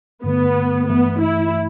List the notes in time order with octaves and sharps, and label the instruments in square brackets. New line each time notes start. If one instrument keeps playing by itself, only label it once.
[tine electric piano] G2 D3 A3 [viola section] B3
[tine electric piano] G2 E3 A3 [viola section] B3
[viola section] E4